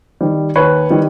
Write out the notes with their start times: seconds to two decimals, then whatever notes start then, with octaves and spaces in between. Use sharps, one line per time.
0.21 D#3 G3
0.56 D#2 B4 C#5
0.90 D#3 G3